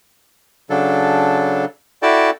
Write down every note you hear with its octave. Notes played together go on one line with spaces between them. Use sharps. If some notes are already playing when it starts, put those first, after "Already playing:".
C#3 F#3 D4 A4
E4 F#4 A4 D5 G5 A5